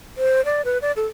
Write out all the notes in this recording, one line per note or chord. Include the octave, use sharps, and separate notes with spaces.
C5
D5
B4
D5
A4